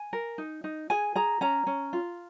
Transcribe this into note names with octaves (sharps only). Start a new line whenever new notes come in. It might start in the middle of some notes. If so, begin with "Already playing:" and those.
Already playing: G#5
A#4
D#4
D#4
G#4 G#5
G#4 A#5
C#4 A#5
C#4
F4